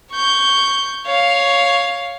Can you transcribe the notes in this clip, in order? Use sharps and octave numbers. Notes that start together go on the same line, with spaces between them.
C#6 G6
C#5 F5